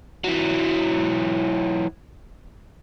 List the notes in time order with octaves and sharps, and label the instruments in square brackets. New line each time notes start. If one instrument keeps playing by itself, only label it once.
[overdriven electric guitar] E3 F#3